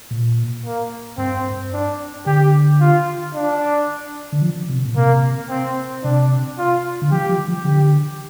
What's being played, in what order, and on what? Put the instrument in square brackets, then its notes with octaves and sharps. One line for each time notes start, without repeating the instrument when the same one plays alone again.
[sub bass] A#2
[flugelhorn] A#3
[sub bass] G2 [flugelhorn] C4
[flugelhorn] D4
[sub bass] D3 [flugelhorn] G4
[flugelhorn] F4
D4
[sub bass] D3
F3
C3
A#2
[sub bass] C3 [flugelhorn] A#3
[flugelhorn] C4
[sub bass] C3 [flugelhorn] D4
[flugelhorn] F4
[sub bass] D3
[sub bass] F3 [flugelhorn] G4
[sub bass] F3
F3
[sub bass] D3 [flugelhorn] G4